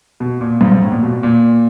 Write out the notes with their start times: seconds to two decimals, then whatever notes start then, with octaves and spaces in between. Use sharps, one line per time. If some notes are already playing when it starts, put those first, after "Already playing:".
0.20 B2
0.41 A#2
0.61 G#2
0.72 G#2
0.82 A2
0.92 A#2
1.02 B2
1.23 A#2